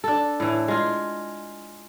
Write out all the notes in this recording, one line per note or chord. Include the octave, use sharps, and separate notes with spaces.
D4 A4
A2 E3
G#3 F4